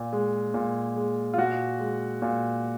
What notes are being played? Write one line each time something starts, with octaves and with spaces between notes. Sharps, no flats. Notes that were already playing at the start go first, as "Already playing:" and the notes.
Already playing: A#2
G#3
A#2
G#3
F4
A#2 F#4
G#3
A#2